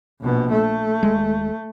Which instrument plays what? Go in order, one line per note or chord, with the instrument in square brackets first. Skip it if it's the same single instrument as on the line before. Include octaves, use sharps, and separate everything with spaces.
[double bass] A#1 B2
A3
[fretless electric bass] D#1 G#3